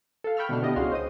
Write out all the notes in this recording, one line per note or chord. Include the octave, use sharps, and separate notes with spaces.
A4 F5
G5 B5 C#6 E6 F6
B2 D3 A3 D4 F6
B3 D4 E4 G4 D#5
C#2 C#4 F#4 G#4 F5 C6
C5 D#5 D#6